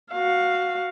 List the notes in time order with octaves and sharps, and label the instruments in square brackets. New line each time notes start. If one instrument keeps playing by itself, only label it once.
[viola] F#4 F5